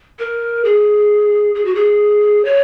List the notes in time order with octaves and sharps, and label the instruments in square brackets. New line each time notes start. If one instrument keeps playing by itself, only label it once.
[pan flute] A#4
G#4
G#4
F#4
G#4
C#5